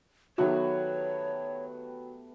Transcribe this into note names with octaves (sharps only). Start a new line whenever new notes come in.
D#3 F#3 A3 B3 F#4 G4 C#5